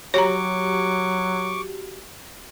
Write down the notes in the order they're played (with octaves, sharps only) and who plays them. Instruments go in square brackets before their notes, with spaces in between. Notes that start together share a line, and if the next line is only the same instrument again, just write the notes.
[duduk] F#3 [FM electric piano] F#4 G4 [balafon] C#5 A#5 [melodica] C#6 D6